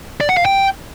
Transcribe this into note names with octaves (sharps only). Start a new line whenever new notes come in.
D5
F#5
F5
G5